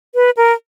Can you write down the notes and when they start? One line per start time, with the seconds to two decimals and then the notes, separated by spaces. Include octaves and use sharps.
0.15 B4
0.37 A#4